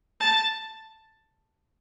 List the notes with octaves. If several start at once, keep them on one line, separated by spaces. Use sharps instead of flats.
A5